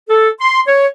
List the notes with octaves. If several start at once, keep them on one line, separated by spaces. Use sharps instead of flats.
A4
C6
C#5